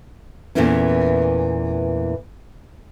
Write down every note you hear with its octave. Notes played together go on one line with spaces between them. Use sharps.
E2 A#2 E3 A3 A#3 C#4